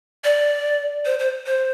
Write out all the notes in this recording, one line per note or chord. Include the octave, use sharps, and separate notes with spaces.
D5
C5
C5
C5